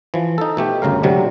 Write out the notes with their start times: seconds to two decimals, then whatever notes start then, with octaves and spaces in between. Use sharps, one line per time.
0.14 E3 F3
0.38 D#4 A4
0.57 B2 A3 G4
0.82 G1 D2 C#3 A#4 F5
1.03 D2 G#2 C3 F#3 G3